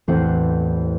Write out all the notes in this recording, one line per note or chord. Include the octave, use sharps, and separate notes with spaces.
A1 E2 C4 C5 F#5